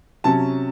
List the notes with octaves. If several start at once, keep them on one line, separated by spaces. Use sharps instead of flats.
C3 F#3 C#4 A5